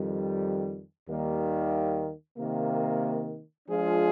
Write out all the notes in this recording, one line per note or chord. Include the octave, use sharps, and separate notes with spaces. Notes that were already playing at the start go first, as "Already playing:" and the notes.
Already playing: F2 D#3 G3
D#2 D#3 G3 A#3
C3 D#3 A#3
F3 G#3 D4 F4 G#4